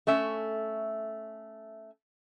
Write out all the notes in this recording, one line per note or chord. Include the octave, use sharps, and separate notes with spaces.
A3 C#4 E5